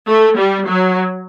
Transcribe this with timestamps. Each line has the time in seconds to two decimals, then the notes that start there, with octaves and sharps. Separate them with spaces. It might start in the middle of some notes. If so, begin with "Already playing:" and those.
0.08 A3
0.38 G3
0.67 F#3